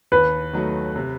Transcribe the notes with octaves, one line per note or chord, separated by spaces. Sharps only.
D#2 B4
D#3 F#3 A3
C3